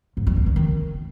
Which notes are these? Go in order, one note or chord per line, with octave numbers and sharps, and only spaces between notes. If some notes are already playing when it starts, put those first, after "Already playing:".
G#2
G3
A#3
E3
D#3